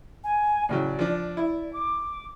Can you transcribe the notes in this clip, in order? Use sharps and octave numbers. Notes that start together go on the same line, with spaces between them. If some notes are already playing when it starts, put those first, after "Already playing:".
G#5
A2 C#3 F#3 D5
F3 D4
E4
D6